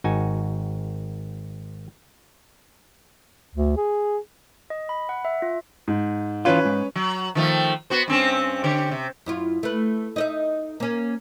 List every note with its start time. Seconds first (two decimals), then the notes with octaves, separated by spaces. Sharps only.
0.04 G#1 D#4 F#4 G#5
3.55 D2
3.77 G#4
4.70 D#5
4.89 B5
5.09 F#5
5.25 E5
5.42 F4
5.88 G#2
6.45 E3 C#4 F4 B4 C#5
6.65 G#2
6.96 F#3
7.35 D#3 F3 A3
7.90 B3 F#4 C5
8.08 G2 C4 C#4
8.64 D3 G4 C#5
8.91 C3
9.26 F#2 E4 F4
9.63 A3 B4
10.16 D#4 D#5 E5
10.80 A#3 C#4